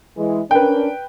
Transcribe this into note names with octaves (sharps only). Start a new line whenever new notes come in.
E3 G#3
C#4 D4 A#4 B4 G5